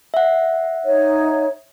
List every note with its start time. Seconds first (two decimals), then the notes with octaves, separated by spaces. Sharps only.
0.14 E5 F#5
0.85 D#4 C#5